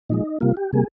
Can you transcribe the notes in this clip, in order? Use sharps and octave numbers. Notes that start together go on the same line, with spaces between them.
A#2 F3 G#3 D#4
C3 G3 A#3 F4
G4
C3 G3 A#3 G#4